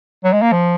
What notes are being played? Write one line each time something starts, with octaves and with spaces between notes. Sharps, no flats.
F#3
G#3
A#3
F3